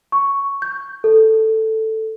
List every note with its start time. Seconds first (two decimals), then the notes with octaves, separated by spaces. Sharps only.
0.12 C#6
0.62 G6
1.04 A4